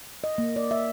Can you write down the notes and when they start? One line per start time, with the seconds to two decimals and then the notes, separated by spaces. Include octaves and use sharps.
0.24 D#5
0.38 A#3
0.56 D5
0.71 E5